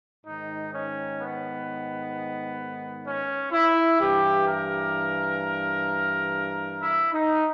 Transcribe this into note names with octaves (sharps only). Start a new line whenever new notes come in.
G#2 D#3 D#4
C#4
B3
C#4
E4
G2 E3 G4
A#4
E4
D#4